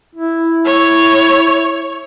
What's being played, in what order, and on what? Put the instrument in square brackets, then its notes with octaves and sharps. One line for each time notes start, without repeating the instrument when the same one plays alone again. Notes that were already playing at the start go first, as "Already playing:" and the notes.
[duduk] E4
[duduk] E4 [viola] C#5